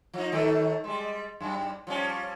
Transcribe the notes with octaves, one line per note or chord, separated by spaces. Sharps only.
F3 D#4
D#3 F#3 A3
G3 G#3
F#2 G3
F3 G3 C#4